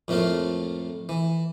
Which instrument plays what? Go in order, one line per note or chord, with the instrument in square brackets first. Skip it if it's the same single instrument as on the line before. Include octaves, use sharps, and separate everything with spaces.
[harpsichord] F2 A2 A3 A#3 F4
E3